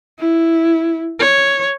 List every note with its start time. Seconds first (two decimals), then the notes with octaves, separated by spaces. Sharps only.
0.19 E4
1.20 C#5